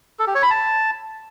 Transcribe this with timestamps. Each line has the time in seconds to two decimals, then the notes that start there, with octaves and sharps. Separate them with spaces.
0.19 A4
0.27 G4
0.35 C#5
0.43 B5
0.50 A5